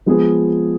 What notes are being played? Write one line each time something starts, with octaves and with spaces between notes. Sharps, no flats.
F3 G#3 B3 F4 G#4